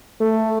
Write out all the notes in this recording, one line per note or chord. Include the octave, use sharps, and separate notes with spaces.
A3